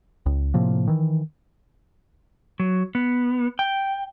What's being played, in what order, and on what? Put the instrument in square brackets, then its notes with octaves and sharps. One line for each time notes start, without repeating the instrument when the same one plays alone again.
[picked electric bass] C#2
A2 C3 F3 A#3
D#3 E3
[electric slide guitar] F#3
B3
G5